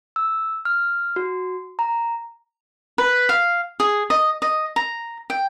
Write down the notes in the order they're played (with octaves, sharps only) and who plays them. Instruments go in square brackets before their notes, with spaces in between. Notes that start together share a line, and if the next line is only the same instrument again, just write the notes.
[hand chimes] E6
F6
F#4
A#5
[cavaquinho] B4
F5
G#4
D#5
D#5
A#5
G5